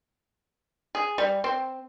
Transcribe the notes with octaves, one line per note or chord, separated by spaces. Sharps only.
G#4
G3
C4